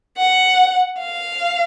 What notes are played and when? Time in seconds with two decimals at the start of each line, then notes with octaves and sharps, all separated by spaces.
0.17 F#5
0.99 F5